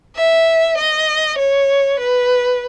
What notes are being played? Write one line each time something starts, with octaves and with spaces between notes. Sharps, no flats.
E5
D#5
C#5
B4